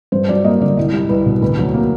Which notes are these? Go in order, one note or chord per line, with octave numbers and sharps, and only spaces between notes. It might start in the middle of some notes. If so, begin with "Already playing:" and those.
G2 C5
F#3 D5
A#3 D#5
D3 D5
C2 D#5
G3
C2 B4
B2
D2 B4
F#3
A#3